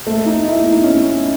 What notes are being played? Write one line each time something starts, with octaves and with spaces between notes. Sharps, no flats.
A3
D#4
E4
D#4
C#4